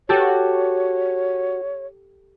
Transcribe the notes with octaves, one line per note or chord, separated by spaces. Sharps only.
F#4 G4 A4 C#5 A5